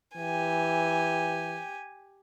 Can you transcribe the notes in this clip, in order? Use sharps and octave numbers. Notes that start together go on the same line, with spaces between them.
E3 G4 G#5